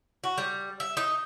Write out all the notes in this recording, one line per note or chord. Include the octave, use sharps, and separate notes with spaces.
F#4
G3
E5
D#4